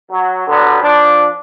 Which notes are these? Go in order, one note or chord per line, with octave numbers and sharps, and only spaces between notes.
F#3
D3 F#3 G3 B3
F3 D4